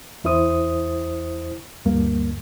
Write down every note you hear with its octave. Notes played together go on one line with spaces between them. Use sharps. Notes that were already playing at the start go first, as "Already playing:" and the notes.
E2 E4 C5 D#6
D2 G2 A#3